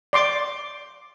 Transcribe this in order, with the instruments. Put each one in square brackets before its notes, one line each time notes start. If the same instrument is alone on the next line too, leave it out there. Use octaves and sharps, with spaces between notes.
[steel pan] D5 C6 D6